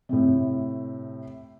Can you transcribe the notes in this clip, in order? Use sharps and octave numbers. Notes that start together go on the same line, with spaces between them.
A2 C3